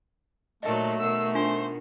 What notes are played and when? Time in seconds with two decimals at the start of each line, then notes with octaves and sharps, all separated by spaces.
0.63 A#2 D#3 F#3 A3 A4 D#5 E5
0.99 B2 D#3 E6
1.35 D4 F4 C5 G#5